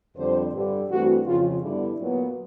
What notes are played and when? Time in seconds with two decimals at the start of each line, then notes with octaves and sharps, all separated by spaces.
0.16 F2 D3 G3 C5
0.53 G2 D3 G3
0.89 G2 E3 A3 C4 F#4
1.25 F2 C#3 F3 F4
1.62 G2 D3 G3 B3 E4
1.98 A#2 F#3 B3